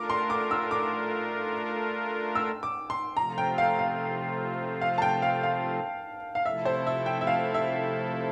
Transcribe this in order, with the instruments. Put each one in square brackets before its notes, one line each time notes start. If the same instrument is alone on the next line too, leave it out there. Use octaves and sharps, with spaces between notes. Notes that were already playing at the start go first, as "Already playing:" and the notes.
Already playing: [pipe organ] A3 D4 F4 A#4 [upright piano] D6
[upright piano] C6
D6
E6
D6
E6
D6
C6
[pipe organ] C3 F3 A3 C4 F4 [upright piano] A#5
[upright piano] G5
F5
F5
F5
A5
G5
F5
F5
F5
[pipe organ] C3 F3 A3 E4 A4 [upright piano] E5
[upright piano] C5
E5
G5
E5
F5
E5